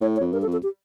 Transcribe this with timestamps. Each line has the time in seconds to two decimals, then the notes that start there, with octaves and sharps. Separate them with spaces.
0.01 A2 C#5
0.17 C#5
0.21 F2
0.32 G2 A#4
0.42 A4
0.47 F2
0.52 A4
0.63 G4